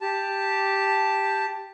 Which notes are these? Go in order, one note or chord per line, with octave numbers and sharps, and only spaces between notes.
G4 A5